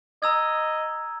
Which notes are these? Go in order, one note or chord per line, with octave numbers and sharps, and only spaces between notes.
D#5 A#5 E6 G#6